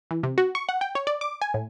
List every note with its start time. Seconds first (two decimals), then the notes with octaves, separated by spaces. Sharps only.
0.11 E3
0.23 C3
0.38 F#4
0.55 C#6
0.69 F#5
0.81 G5
0.95 C#5
1.07 D5
1.21 D6
1.42 G#5
1.54 A2